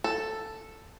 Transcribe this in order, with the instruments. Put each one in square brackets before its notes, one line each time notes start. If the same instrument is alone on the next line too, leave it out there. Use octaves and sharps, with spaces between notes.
[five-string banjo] A4